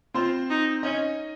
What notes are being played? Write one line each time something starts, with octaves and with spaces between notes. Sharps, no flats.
C4 F4 C5
D#4
C#4 D#4 D#5